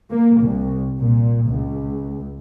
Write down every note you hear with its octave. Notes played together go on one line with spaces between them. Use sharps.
A#3
C2
A#2
C#2